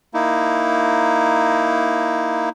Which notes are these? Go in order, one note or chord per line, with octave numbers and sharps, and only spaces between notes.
A#3 D#4 E4